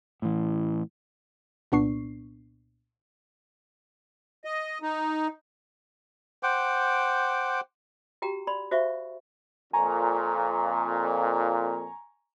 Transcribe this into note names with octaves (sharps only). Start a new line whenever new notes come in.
A2 E3
C2 A#2 B3 D4 C#6 C7
D#5
D#4
C5 F#5 G5 D6
F#4 G4 G5 A#5
D5 B5 C6
F#4 C5 E5 F5 C#6
F2 A#2 G#5 A#5 C#6